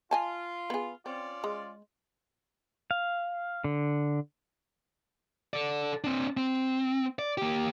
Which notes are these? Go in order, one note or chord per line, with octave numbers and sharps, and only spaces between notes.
F4 D#5 G#5 A5
B3 G#4
C4 C#4 F4 D5
G#3
F5
D3
A4 D5
C4 D4
C4
D5
A#3 G4